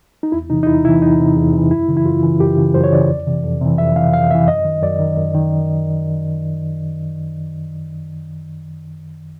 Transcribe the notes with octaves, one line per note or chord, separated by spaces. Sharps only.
D#4
E2 E4
C3 E3 D#4
D#4
E2 E4
C3 E3 E4
E2 D#4
C3 E3
E2
C3 E3
F#2 E4
C#3 E3
E4
F#2 F4
C#3 E3
F#2 G4
C#3 E3
F#2 C5
C#5
C#3 E3 D5
F2
C3 E3
F2
C3 E3
F2 E5
C3 E3 F5
F2 F5
C3 E3 E5
F#2 D#5
D#3
F#2 D5
D#3
F#2
D#3